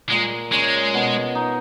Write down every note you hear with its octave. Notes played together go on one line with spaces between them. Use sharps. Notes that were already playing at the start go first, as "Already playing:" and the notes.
A#2 G#3
G#3 C#4
B2
D#4